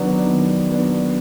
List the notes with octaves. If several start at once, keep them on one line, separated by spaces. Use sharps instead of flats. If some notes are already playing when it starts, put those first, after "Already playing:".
Already playing: D#3 F#3 B3 D4
D#3
F#3 B3 D4